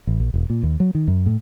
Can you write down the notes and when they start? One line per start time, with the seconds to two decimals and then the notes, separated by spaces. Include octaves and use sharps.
0.07 A1
0.20 A#1
0.34 E1
0.50 A#2
0.63 D#2
0.80 F#3
0.95 D#3
1.08 F#2
1.26 A2